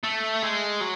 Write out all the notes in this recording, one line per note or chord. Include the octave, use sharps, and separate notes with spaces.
A3
G#3
F#3